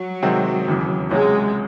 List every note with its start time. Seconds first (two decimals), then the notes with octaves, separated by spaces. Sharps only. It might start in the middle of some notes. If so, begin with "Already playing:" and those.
Already playing: F#3
0.22 C3 D#3 G#3 C4 F#4
0.67 E1 D#2 C#3 E3
1.10 C#2 C3 F#3 G#3 C#4 F#4